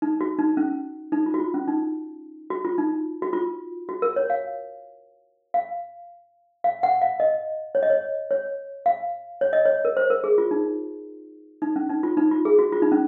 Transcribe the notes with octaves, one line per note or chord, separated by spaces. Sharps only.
D#4
F#4
D#4
C#4
D#4
F4
F#4
F4
C#4
D#4
F#4
F4
D#4
F#4
F4
F#4
A#4
C#5
F5
F5
F5
F#5
F5
D#5
C#5
D#5
C#5
C#5
F5
C#5
D#5
C#5
A#4
C5
A#4
G#4
F4
D#4
D#4
C#4
D#4
F4
D#4
F4
G#4
F#4
F4
D#4
C#4